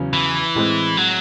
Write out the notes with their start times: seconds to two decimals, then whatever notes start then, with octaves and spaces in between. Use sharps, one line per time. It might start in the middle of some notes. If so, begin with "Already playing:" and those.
Already playing: E2 C#3 F#3 C#4
0.13 E3
0.55 A2 G#3 C4
0.97 F#3